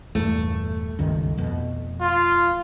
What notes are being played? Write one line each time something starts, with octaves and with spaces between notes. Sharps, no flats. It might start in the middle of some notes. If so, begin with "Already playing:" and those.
E2 G2 A#2 A3
C#2 G2 D#3
F2 B2
F4